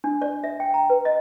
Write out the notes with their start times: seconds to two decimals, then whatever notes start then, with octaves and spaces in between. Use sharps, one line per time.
0.04 D4
0.22 D5
0.44 E5
0.60 G5
0.74 A#5
0.90 B4
1.05 D#5